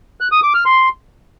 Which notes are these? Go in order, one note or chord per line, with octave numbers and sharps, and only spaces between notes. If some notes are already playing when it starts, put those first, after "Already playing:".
F#6
D#6
D6
F6
C6